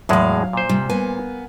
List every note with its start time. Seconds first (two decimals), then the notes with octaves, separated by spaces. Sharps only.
0.09 E2 A2 F#3 G#3 F5
0.53 A#2 C5
0.69 C3 G3
0.89 A#3 B3 G#5